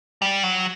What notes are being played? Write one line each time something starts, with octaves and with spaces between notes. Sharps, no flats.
G3
F#3